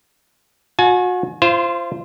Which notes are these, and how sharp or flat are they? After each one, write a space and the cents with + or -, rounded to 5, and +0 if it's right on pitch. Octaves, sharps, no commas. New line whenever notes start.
F#4 -35 G#5 +30
F4 -30 C5 +0